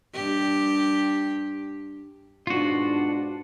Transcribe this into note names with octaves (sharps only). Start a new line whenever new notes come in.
G2 G4
G#2 B2 D4 F4 F#4